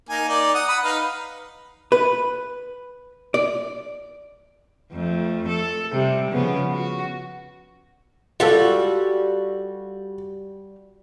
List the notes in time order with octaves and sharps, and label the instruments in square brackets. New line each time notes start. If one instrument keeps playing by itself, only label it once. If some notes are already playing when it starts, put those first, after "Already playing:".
[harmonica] A#3 D#4 G#5
D#4 D5
F#5 D#6
F#5 B5 D#6
D#4 B4 F5
[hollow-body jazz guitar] B4
D5
[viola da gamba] F2 A3
A4
C3 G3
C#3 F3 B3
F#4
[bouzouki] G3 F#4 [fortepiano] F4 A4